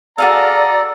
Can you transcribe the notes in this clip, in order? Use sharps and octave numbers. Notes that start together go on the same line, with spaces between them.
F#4 G#4 A4 D5 F5 A#5